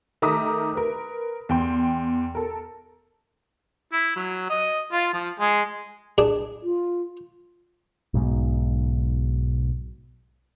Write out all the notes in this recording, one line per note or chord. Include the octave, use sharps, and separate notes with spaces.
D#3 A3 A#5 D6 D#6 B6
A#4 B4
E2 G5 C6
A4 A#4
E4
F#3
D#5
F4
F3
G#3
D4 G#4
F4
B1 G#2 B2